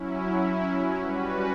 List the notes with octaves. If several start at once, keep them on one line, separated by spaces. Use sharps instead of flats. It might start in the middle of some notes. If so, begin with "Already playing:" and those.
Already playing: F#3 C#4 E4
G3 C#4 F#4 B4